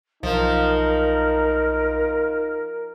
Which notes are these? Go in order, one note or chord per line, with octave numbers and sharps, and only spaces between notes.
B1 F3 D#4 A#4